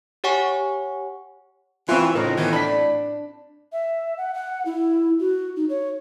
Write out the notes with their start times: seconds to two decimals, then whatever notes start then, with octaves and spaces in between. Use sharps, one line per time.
0.24 G4 C#5 F#5 G#5 C#6
1.89 E3 C4 F4 B4 C5 E5 C6 C#6
2.15 A2 C#3 F#3 D#4 F4 A#4
2.37 D#3 E3 B3
2.53 D4 B5 B6
3.72 E5
4.18 F#5
4.34 F#5
4.65 E4
5.20 F#4
5.56 D#4
5.69 C#5